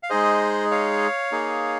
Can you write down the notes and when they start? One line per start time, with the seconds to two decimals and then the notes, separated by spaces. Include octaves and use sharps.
0.03 F5
0.10 G#3 D#4 G#4 C5 D#5
0.71 C#5 F5
1.32 A#3 D#4 G#4